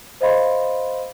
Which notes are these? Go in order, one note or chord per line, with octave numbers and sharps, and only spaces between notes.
C5 D#5 F5 B5 C6